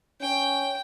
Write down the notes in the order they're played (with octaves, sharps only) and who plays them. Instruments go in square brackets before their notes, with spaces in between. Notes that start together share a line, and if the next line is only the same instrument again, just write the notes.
[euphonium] C#4 [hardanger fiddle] G5